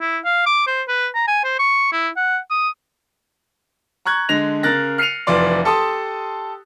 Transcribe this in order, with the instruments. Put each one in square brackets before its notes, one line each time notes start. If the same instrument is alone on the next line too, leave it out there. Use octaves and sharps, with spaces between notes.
[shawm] E4
F5
D6
C5
B4
A#5
G#5
C5
C#6
E4
F#5
D#6
[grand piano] A#5 C#6 F#6 G#6
D3 G#3 A#6 F7
C#3 A#4 F#6 A6 A#6
F6 C7 C#7 D#7 F7
F1 E3 F4 D5 C6
G4 A4 A5 C6 D#6